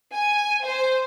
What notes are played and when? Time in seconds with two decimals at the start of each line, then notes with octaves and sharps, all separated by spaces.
0.14 G#5
0.65 C5